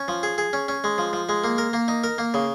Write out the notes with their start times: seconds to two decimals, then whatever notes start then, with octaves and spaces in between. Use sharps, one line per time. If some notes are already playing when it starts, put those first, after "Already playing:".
Already playing: C#4
0.08 F3
0.23 G#4
0.38 G#4
0.53 C#4
0.68 C#4
0.84 G#3
0.98 F3
1.13 F3
1.29 G#3
1.44 A#3
1.58 A#4
1.73 A#3
1.88 D#4
2.04 A#4
2.18 A#3
2.34 C#3